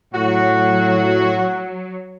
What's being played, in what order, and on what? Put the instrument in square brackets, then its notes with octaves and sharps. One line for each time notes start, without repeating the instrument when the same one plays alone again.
[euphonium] A2 [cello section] F#3 [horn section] F#4